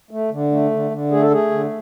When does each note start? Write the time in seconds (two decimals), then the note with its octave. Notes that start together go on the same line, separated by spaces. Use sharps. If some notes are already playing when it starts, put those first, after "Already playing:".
0.11 A3
0.31 D3
0.51 A3
0.71 D3
0.91 D3
1.11 A3 G#4
1.22 A4
1.31 A3 G#4
1.51 D3